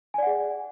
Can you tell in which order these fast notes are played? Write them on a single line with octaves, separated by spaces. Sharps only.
G#5 D5 F#5 G#4